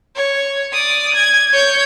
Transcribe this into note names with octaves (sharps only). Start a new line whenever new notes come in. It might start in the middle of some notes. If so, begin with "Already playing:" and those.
C#5
D5 D#6
G#6
C#5 G6